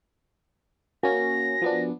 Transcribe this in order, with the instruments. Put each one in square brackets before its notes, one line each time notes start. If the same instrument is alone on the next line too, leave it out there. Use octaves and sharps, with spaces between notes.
[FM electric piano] A#3 C#4 [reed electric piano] F#4 A#4 G#5 [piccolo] A#6
[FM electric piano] F3 B3 D4